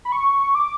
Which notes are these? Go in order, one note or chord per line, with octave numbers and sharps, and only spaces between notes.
B5
C#6
D6